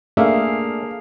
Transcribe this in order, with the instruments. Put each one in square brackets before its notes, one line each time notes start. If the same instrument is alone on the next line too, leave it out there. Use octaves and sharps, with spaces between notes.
[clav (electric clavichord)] A3 D4 E5 [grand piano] A#3 [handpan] G#4 F5